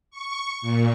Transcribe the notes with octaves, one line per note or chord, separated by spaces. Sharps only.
C#6
A#2